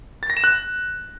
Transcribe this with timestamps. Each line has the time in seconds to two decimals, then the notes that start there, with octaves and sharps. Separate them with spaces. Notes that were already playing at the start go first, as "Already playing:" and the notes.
0.23 A6
0.30 A#6
0.37 E7
0.44 F#6